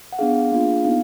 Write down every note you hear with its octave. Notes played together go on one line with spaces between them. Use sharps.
F#5
B3 D4 G#4 F5
A#3 D4 F4 G#4 F5
B3 D#4 F5